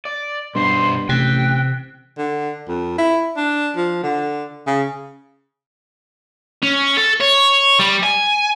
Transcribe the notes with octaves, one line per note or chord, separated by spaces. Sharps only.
D5
G2 B2 C5 C6
A1 C3 G5 F#6
D3
F2
E4
D4
F3
D3
C#3
C#4
A4
C#5
G3
G#5